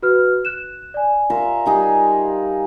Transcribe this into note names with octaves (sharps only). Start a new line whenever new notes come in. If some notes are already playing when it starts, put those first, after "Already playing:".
F#4 B4 F6
F#6 E7
D5 G#5
F4 A#4 E5
G3 D#4 G#4